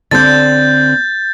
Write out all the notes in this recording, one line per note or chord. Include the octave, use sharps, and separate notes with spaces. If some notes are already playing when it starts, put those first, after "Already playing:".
D3 C4 D5 G6 A6